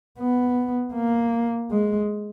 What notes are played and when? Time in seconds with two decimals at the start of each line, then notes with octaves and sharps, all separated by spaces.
0.19 B3
0.94 A#3
1.71 G#3